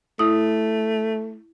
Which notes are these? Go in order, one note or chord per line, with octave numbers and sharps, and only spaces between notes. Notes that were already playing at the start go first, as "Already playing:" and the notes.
A3 E4 D#6